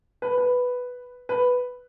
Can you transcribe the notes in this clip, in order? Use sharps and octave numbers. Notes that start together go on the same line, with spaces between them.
B4
B4
B4